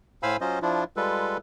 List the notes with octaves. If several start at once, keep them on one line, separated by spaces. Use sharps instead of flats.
A2 C5 F5 G#5 B5 E6
F#3 C#4 F4 C5 D#5
F3 D4 E4 F4
G3 G#3 F4 A4 B4